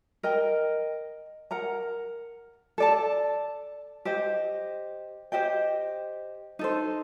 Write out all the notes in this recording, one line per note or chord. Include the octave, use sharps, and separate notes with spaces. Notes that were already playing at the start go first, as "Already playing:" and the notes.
A#4 D#5 G5
A#4 F#5 A#5
A4 D5 A5
G4 C5 D#5
G4 C5 D#5 G5
D#4 A4 C5